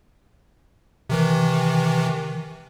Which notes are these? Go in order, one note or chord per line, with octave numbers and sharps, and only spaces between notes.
C3 D#3 E3